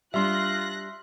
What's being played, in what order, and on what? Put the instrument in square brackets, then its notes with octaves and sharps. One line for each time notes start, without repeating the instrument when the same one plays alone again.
[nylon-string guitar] G3 D4 [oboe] F4 [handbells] E5 C6 [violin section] F#6 A#6